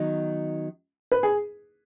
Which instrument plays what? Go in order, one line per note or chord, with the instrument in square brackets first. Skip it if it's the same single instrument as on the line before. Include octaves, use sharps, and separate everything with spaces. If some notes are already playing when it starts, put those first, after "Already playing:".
Already playing: [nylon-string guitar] D#3 F#3 B3 D#4
[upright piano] B4
G#4